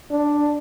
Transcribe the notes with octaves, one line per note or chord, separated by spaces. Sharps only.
D4